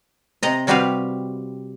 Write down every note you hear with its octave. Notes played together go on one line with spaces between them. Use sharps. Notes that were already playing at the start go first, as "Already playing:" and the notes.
C3 D#5 A#5
C3 G3 F#4 G4 B4 F5